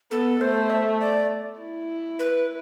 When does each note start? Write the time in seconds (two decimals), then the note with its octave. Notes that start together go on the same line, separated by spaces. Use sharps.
0.11 B3 A4
0.40 A3 C5
0.70 E5
1.00 D5
1.60 E4
2.19 B4